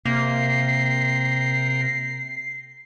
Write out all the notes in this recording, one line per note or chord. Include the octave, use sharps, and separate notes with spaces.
C3 A#3 A#4 G5 A#5 C7